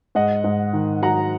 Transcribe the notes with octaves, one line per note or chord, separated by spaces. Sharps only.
G#2 D#5 F#5
G#2
D#3
F#3 F#5 A#5